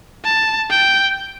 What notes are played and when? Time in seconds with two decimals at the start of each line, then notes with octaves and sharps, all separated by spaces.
0.25 A5
0.70 G5